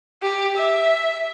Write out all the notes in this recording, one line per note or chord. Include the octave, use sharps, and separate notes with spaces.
G4
E5